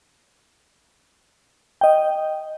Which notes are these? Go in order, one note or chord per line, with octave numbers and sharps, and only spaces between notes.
D#5 G5